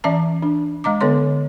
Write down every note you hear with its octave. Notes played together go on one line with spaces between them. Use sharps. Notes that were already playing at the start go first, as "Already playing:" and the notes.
E3 C#4 D5 E5 A5 A#5
D4
G#3 D#5 A#5 D6
D3 B3 A4 C#5 C6